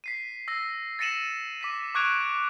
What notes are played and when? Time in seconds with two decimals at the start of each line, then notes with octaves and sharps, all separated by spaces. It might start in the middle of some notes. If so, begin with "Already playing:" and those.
0.04 B6 C7 D#7
0.48 E6 A#6 C7
0.99 A6 A#6 C#7 D#7 E7 F#7
1.61 D6 B6 D#7
1.95 C#6 D6 F#6 G#6 D7 F7